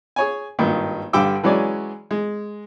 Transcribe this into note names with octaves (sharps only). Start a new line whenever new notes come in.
G#4 C#5 G#5
G#1 G2 A#2 D#3
G2 D3 G3 G5 D6 E6
E3 F#3 G#3 C#4 D5
G#3